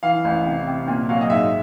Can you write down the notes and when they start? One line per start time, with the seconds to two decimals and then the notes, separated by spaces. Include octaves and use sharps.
0.03 E3 F5
0.25 A1
0.45 C3
0.67 C3
0.88 A#2
1.09 F#3 F5
1.21 D#5
1.30 G#2 E5